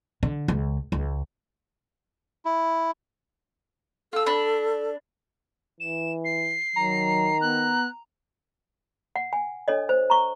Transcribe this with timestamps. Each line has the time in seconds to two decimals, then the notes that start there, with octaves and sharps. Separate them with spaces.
0.23 D3
0.48 C#2
0.92 C#2
2.45 E4
4.13 F4 A4 E6
4.26 D4 B5
5.80 E3 E7
6.25 C7
6.76 D#3 F#3 A#5
7.41 B3 F#6
9.16 F#5
9.33 G#5
9.68 D4 A4 C#5 D#5
9.89 C5
10.10 A#5 C#6